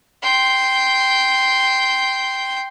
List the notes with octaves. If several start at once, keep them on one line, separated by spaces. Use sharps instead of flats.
G5 C6